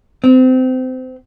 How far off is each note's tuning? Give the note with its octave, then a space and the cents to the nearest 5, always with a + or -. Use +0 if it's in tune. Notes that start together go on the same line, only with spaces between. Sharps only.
C4 -25